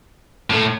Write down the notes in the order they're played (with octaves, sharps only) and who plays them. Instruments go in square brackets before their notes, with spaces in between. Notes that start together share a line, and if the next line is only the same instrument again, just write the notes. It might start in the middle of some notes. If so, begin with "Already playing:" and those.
[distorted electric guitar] A2